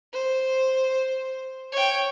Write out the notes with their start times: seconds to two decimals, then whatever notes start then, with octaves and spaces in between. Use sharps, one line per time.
0.13 C5
1.72 C#5 G5